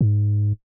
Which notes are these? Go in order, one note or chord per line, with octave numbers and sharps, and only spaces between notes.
G#2